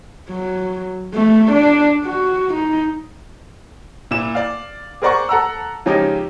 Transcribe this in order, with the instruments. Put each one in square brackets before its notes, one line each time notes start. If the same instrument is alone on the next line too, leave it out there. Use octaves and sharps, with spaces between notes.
[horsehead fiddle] F#3
A3
D4
F#4
D#4
[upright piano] A#2 E4 E7
D5 F5
G#4 A#4 C5 D5 F#5 C#6
A4 F#5 A#5 E6
C#3 F3 G#3 C#4 D#4 G4